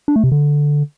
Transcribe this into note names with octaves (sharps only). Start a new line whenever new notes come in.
D4
A3
C3
D3